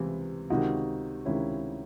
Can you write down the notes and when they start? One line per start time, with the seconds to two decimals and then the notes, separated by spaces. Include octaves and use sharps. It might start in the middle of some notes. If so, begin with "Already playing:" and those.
Already playing: C#2 C3 E3
0.50 C#2 C3 D#3 D#4 F#4
1.25 C#2 C3 D#3 C#4 E4